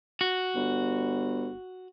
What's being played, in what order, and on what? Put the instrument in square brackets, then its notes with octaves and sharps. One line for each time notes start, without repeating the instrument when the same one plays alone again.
[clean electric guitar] F#4
[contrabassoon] G1